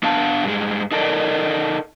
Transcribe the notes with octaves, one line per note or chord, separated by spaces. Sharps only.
B3 D4 F5 A5
G2 G#3
D#4 A4 A#4 D5 D#5